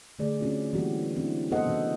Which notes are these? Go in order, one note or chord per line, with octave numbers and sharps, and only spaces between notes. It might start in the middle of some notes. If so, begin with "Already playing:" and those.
D3 A3 G#4 D5
C4 C#4 F4 F#4
E3 G3 A#3 C4 F#4 G4
E3 C4 D4 E4
A#3 B3 A4 C5 D#5 F#5
C#3 E3 D4 F#4